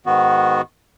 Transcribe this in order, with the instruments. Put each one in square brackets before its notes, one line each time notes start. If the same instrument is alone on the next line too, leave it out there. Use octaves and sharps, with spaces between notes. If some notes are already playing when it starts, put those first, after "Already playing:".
[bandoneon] G#2 D#3 B3 F#4